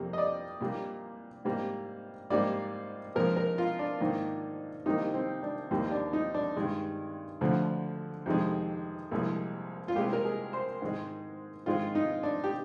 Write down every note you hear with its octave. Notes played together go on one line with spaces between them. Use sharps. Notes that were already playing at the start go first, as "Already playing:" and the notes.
Already playing: F2 C3 G3 A#3
D#5
D5
A#2 G3 A#3
G#2 G3 A#3
G#2 G3 A#3 D5
A#2 F3 G#3 A#4
A#4
F4
D4
G#2 D#3 A#3
C2 C3 D#3 A#3 D#4
C4
D4
D#2 D#3 G3 A#3 C4
D4
D#4
D4
G2 D#3 G#3
D2 D3 F3
F2 C3 D#3 G#3
C2 A#2 F3 G#3
F4
C2 A#2 G#3 G4
A#4
G#4
C5
G#2 D#3 G#3
G#2 D#3 G#3 F4
D#4
D4
G4